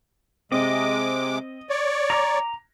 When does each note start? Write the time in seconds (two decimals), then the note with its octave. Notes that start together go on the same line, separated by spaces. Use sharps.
0.52 C3 G#3 C4 D#5 D6
1.70 C#5 D5
2.10 A#5 D6 A#6